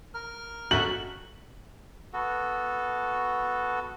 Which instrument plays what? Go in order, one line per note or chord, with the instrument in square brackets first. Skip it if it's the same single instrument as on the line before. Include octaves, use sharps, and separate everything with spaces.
[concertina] A#4 F6
[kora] F#4 A4 E5 [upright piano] F#7
[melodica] B3 F#4 A4